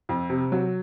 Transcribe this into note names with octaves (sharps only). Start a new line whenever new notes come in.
F2
C3
F#3